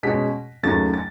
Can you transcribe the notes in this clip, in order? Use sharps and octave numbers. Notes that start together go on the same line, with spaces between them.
B2 G#3 C#4 B6
D#2 C#3 F#3 A3 C#4 A6
A6